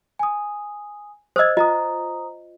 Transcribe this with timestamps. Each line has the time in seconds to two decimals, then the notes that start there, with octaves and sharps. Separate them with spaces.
0.19 G#5 D#6
1.36 C5 D#5 D#6 E6 G#6
1.57 F4 C5 D#5 A#5 D#6